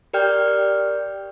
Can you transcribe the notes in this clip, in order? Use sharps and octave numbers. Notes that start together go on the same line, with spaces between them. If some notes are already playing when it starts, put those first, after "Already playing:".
G4 A#4 D5 G5 F6 G6